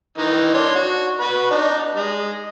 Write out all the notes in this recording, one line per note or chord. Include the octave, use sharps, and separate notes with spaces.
D#3 E3 D#4
D4 C#5 C6
F#4
F#4 B4 B5
D4 D#4
G#3